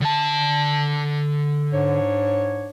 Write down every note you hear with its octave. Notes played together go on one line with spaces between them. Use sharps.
D3 A5
G#2 D4 C#5